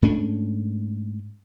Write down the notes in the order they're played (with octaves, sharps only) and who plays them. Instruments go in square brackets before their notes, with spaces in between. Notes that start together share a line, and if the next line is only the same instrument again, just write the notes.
[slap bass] G#2 A3 C#4 D4